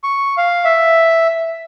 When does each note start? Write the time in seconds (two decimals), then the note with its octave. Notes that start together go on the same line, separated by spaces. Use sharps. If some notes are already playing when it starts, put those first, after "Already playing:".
0.04 C#6
0.37 F5
0.65 E5